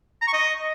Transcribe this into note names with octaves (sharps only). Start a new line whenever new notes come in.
A#5
C#6
D#5